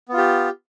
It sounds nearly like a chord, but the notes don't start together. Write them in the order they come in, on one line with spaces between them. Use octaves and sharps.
B3 F4 G4